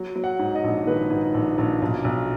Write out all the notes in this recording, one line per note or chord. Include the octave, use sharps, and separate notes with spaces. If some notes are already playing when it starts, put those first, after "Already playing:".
Already playing: F#3
F#3
F#5
G#2
D#5
A#1
D#3 B4
G#2
A#1
A#1
B1
B1